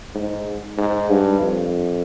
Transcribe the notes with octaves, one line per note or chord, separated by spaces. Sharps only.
G#2
G#2
G2
F2